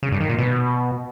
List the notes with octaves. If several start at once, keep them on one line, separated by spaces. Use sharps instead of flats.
C#3
G2
D#3
A#2
B2